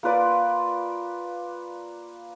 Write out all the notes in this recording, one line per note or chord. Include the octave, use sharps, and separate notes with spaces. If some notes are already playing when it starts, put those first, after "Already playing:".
A#3 F4 B4 D5